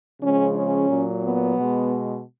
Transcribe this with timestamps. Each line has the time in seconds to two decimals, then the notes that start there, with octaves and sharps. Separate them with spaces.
0.21 C#3 F3 G#3 C#4
0.55 C#4
0.89 A#2 F#3
1.22 B3
1.57 B2 G#3